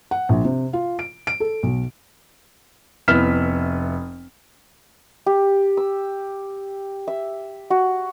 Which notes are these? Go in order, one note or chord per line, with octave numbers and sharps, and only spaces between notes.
F#5
A#1
C3
F4
D7
D7
A4
B1
F1 B3 E4 F6 B6 E7
G4
E6
E5
F#4